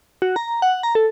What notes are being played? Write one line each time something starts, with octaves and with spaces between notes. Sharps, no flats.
F#4
A#5
F#5
A#5
A4